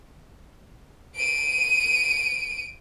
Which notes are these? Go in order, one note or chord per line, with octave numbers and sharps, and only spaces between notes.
D7 D#7